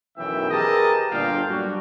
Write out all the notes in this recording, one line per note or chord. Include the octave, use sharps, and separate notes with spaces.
B1 F#2 D#3 E3 E5 G5
G4 G#4 A#4 B4 D#5 A5
G1 A#2 D3 D4 F5 G5
F#3 G3 D4 F#4